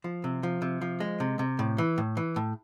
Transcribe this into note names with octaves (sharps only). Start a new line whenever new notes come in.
F3
C3
F3
C3
F3
G#3
C3
C3
A2
E3
A2
E3
A2